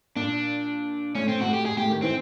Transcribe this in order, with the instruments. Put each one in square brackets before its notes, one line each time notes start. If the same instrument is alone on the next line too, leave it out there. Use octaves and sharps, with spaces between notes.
[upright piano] A#2 [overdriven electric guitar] D4
[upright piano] A2 [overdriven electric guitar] C#4
[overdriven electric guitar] C4
[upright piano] A2 [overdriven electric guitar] F#4
[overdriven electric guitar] G4
G#4
[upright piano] A2 [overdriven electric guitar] G4
[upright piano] D#3
[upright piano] E3 [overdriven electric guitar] C4